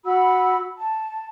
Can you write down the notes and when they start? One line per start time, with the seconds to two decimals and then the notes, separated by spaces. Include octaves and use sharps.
0.04 F#4 F#5 B5 E6
0.78 A5